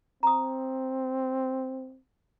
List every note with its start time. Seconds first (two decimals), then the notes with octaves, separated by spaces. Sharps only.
0.23 C4 A#5 D#6